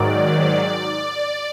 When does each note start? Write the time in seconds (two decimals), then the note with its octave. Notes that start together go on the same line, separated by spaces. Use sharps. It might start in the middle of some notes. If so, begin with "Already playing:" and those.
Already playing: G#2 D#3 F#3 D5
0.40 D5